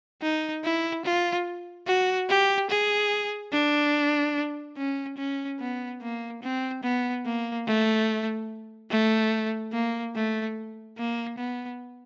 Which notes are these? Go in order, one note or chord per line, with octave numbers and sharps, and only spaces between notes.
D#4
E4
F4
F#4
G4
G#4
D4
C#4
C#4
B3
A#3
C4
B3
A#3
A3
A3
A#3
A3
A#3
B3